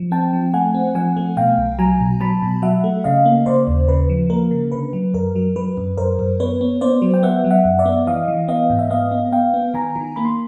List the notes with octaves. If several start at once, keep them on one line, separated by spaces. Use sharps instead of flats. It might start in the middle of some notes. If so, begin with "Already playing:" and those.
Already playing: F3
C4 G5 A5
F3
A3 F#5 G#5
C4
F3 F#5 G#5
A3
B2 F5 G5
B1
F#3 G#5 A#5
B2
F#3 A5 B5
B2
F#3 E5 F#5
A3
C#3 D#5 F5
A#3
C#3 C5 D5
D#2
C#3 B4
F3
A#3 A#4
C#3
D3 B4
F#3
F#2 A#4
F#3
F#3 B4
F#2
F#2 A#4 C5
F#2
B3 B4 C#5
B3
B3 C5 D5
F#3
G5
B3 E5 F#5
F#3
E5 F#5
F#2
D5 E5
B3
E3 D#5 F5
E3
B3 D#5 F5
G#2
E5
B3 D#5 F5
B3
B3 F5 G5
B3
D#3 G#5 A#5
D#3
A#3 B5
C6